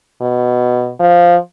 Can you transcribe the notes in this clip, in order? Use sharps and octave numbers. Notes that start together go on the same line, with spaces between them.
B2
F3